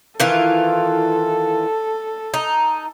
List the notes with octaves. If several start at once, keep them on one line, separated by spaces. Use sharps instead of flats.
D#3 E3 F4 A4
D#4